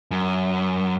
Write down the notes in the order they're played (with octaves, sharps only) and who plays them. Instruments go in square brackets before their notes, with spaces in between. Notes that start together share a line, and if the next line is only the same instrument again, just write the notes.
[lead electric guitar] F#2